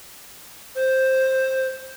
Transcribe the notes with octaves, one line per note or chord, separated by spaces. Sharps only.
C5